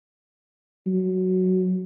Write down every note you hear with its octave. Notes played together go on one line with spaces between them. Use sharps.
F#3